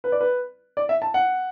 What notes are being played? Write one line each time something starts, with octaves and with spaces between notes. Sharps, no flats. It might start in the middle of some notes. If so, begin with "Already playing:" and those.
B4
D5
B4
D5
E5
A5
F#5